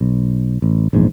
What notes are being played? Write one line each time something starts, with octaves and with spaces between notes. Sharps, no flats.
B1
A1
A#1 E2 G#2